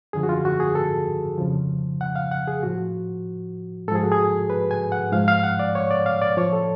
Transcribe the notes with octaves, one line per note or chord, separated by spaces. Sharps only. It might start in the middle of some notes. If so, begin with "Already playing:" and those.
F#2 D3 F3 G#4
F#4
F4
F#4
G#4
A4
F2 C#3 F3
F#5
F5
F#5
G#4
A2 F3 F#4
G#2 F3 G#4 A4
F#4
G#4
B4
G#5
F#5
G#2 F3 F5
F5
F#5
D5
C#5
D5
F5
D5
A2 F3 C#5
A4